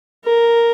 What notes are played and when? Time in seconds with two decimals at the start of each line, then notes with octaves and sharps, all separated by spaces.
0.25 A#4